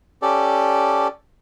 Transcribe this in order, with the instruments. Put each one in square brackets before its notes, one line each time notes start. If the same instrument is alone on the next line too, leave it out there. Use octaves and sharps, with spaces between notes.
[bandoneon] C#4 G4 A4 D5